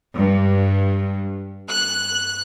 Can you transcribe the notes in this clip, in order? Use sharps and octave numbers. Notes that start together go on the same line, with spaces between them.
G2
F#6